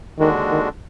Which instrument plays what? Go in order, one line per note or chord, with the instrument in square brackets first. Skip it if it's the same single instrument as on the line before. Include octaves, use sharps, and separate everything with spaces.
[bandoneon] D#2 D3 G#3 D4 F#4 [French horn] D#3
[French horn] D#3